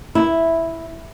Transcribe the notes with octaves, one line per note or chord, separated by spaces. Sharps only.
E4